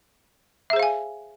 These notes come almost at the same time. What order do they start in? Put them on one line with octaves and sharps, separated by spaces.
E5 G#4 C5 F5 G#5